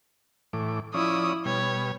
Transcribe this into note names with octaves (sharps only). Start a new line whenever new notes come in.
A2 E3 D6
F3 C#4 E4 D5 D#6
B2 G3 C#5